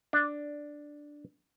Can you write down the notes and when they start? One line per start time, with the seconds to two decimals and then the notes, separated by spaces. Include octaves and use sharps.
0.13 D4